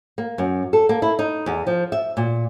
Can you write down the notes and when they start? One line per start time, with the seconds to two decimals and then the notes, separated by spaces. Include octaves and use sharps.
0.18 A#3
0.38 F#2
0.73 A4
0.89 A#3
1.02 E4
1.19 D#4
1.46 E2
1.67 F3
1.92 E5
2.17 A#2